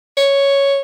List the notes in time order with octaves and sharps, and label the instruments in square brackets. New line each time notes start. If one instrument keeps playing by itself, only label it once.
[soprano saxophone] C#5